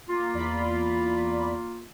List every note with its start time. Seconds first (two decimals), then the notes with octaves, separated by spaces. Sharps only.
0.08 A#3 F4
0.34 E2 D5 B5